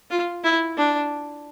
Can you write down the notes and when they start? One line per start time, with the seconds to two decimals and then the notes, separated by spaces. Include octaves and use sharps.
0.11 F4
0.44 E4
0.78 D4